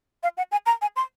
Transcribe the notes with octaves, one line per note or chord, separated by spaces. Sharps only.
F5
F#5
G#5
A#5
G#5
C6